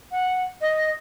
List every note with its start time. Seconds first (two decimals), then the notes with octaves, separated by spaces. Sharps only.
0.12 F#5
0.61 D#5